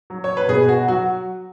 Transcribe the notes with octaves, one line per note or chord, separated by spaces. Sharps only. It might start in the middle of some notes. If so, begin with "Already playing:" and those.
F#3
C#5
B4
B2 G#4
F#4
F#3 F#4